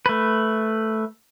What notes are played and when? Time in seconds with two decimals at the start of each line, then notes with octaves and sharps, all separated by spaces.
0.06 A3 B4